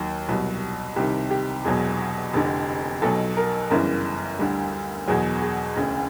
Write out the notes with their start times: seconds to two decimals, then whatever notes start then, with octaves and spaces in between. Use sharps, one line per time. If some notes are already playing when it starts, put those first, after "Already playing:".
Already playing: D#2 D#3 F#3
0.28 C2 B2 F#3
0.96 C2 C3 D#3 G4
1.31 G4
1.65 E1 E2 B2 F#3 G#4
2.33 F1 F2 D3
3.02 B1 B2 F#3 A4
3.37 A#4
3.70 G1 F#2 C#3 E3 A#4
4.39 D2 D3 G3
5.08 E2 B2 F#3 G#4
5.42 G#4
5.76 E1 D2 C#3